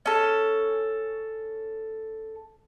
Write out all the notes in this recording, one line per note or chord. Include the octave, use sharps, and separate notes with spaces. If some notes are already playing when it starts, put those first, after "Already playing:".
C#4 A4